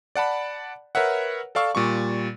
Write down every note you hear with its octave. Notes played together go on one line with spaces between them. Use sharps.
D5 F#5 A5 B5
A#4 B4 C#5 E5 F#5
A4 D5 F5 C#6 E6
A#2 G3 C#6